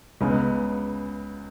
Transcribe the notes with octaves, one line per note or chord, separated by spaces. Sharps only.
C#2 C#3 G#3 B3